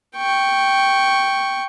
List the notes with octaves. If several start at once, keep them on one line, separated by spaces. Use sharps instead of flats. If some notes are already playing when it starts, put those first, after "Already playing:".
G5 C#6